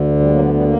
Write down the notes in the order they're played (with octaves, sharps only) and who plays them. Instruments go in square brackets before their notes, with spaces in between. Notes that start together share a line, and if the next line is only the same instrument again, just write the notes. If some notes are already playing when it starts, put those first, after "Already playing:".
Already playing: [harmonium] D2 D3
G3
F#3 A#3
G3 B3
G3 B3
A#3